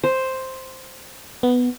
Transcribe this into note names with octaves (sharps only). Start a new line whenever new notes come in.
C5
B3